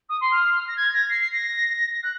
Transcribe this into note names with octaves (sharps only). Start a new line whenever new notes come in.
D#6
C6
F6
A#6
G#6
A#6
C7
C7
A#6
F#6